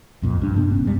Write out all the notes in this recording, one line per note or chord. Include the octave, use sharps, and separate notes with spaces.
C2 F2 A#2
A#1 G2 D4
G2 C3 B3 D4
E1 B3 C#4
G2 C3 G3 G#3